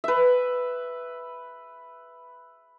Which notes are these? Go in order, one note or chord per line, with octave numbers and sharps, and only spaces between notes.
B4 E5